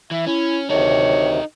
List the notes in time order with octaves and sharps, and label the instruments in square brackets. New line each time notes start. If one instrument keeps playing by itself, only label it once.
[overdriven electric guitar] E3 [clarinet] E5
[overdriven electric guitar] C#4 [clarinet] E4
[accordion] D2 C3 D#3 [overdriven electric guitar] D#4 A4 [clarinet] C#5